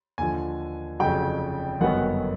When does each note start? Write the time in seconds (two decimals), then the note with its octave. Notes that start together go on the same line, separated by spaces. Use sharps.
0.18 D#2 D3 F3 G#5
0.99 F1 F2 C#3 F#3 G5
1.81 G1 F#2 D#3 F#3 B3 F#5